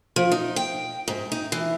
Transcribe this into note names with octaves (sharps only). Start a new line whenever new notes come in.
F3
D#4
G5
G#2
D#4
E3